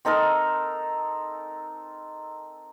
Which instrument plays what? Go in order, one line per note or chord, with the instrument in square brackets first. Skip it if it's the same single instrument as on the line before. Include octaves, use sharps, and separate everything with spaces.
[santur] C4 D#4 A4 A#4